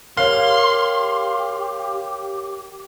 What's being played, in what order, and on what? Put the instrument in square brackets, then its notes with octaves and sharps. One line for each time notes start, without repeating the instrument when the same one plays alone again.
[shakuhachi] G4 [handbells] A#4 C#5 [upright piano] F5 [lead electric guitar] C6